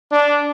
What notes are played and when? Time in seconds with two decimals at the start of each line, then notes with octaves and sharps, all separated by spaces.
0.11 D4